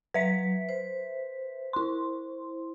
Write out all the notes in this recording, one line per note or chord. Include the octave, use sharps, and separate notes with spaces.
F#3 B4 E5 B6
C5
E4 C6